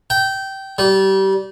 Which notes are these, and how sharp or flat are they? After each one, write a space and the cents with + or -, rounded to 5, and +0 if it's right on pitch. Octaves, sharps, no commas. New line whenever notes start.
G5 -15
G3 -25